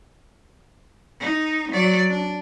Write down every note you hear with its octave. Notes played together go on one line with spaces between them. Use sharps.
D#4
F#3 D5
D4